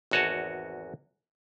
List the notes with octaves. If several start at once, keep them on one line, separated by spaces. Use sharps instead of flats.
G#1 E2 F#4 C#5 D#5 A5